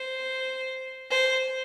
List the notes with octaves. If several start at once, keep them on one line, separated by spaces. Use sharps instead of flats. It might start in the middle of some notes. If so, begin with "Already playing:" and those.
Already playing: C5
C5